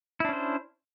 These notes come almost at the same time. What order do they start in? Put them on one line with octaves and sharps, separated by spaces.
E4 D4 C#4 C5